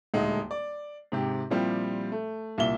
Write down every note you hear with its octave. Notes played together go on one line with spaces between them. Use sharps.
D#1 D2 G#3 D#4
D5
G#2 C3 G4
A#2 F3 G3 C4 E4 G4
A3
C2 A#2 E5 G7